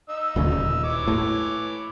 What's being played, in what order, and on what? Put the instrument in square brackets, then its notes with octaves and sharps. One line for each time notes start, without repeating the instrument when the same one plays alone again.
[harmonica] D#4 E6
[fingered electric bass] D#1 D2 C#3
D#1
[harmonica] E3 C#5 D6
[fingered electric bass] A2